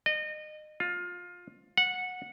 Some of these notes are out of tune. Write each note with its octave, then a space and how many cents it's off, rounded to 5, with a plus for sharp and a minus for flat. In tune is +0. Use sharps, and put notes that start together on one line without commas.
D#5 -30
F4 +20
F#5 -15